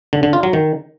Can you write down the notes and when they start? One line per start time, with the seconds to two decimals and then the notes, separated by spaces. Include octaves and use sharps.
0.13 D3
0.23 D3
0.33 F4
0.43 F#3
0.53 D#3